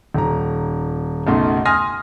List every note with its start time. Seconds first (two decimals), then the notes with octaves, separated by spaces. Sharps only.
0.14 D#1 A#5
1.27 B1 F#2 C#3 A3 D#4 C6
1.65 G#5 C6 D#6 F6 A#6